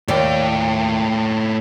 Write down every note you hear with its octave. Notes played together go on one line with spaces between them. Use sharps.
D#2 A2 D5 G5